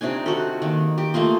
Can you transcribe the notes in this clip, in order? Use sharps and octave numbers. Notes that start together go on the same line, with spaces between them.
C3 D4 D#4 G#5
F#4 A4
D#3 A#3
G4
A3 A#3 F4 D#5